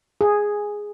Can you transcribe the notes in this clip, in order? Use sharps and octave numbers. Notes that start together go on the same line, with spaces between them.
G#4